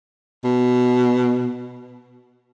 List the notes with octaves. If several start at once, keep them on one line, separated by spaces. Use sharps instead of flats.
B2